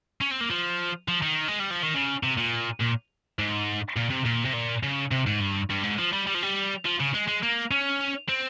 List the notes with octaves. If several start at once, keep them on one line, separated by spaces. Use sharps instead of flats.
C#4
C4
A#3
F3
F3
D#3
G#3
G3
F3
D#3
C#3
C3
A#2
A#2
G#2
A#2
C3
A#2
C3
A#2
C#3
C3
G#2
G2
G2
G#2
F3
G3
G3
F3
G3
F3
C#3
G#3
G#3
A#3
C#4
C4